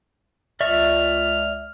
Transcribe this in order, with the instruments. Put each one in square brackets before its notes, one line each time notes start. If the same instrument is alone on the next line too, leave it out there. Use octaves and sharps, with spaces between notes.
[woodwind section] C#2 F6 [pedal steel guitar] D5 E5 C#6